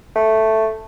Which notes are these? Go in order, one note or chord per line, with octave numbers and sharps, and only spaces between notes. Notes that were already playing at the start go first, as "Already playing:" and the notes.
A3